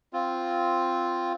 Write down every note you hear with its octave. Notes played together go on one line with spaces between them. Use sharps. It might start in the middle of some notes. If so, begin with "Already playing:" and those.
C4 F4